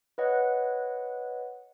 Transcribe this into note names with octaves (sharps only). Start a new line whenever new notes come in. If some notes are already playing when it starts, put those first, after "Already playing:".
B4 C#5 D#5 F#5